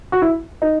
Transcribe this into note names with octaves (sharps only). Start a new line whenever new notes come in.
F#4
E4
D#4